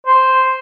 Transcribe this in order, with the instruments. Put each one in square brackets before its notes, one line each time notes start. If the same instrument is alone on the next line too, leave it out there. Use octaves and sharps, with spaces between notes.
[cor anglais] C5